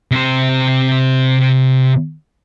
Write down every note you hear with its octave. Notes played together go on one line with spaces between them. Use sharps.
C3 C5